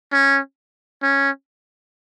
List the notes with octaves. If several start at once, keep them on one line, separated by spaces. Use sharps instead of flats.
C#4
C#4